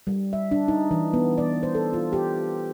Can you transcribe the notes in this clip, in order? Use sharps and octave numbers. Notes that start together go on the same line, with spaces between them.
G3
E5
D4
D#4
E3
B3
D5
C5
A4
F4
G4